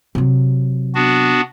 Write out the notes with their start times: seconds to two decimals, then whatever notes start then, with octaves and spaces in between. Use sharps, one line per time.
0.15 C3 F#3
0.95 B3 D4 F#4